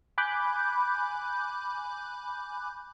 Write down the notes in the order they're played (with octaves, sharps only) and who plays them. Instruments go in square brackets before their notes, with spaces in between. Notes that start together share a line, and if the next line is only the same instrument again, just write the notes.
[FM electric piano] G#5 B5 D6 F#6 G6